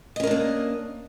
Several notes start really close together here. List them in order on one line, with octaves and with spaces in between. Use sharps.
D#5 C#4 A#4 D4 A#3